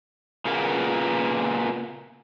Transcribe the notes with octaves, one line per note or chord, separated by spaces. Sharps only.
A#2 C#3 A#3 B3